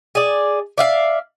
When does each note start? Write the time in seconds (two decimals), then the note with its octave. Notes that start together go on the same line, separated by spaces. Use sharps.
0.15 G#4 D5
0.78 D5 E5 F5